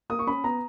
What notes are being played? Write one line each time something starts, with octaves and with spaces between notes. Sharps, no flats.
A#3 D#6
C#6
C#4 B5
B3 A#5